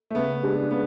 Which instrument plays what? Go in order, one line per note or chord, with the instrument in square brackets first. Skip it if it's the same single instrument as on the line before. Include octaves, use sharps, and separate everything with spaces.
[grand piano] A3
[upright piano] C#3 [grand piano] B3
[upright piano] G#3 D4 G#4
[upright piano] C#3 [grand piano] B3